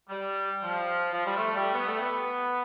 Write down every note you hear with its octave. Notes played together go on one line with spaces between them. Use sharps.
G3
F3
F3
G3
A3
G3
B3
A3
B3